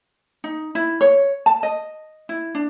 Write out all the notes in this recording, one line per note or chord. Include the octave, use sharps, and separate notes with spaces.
D#4
E4
C#5
A5
D#5
E4
D4